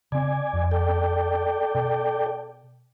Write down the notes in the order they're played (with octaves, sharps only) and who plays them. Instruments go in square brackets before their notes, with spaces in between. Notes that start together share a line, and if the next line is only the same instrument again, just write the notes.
[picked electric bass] C#3 C4 [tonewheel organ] D5 G#5
[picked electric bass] F2
[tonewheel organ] A4 D5 G5
[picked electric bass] B2